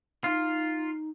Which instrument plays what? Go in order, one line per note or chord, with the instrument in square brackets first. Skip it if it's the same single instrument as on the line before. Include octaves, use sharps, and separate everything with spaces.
[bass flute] D#4 [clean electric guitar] F4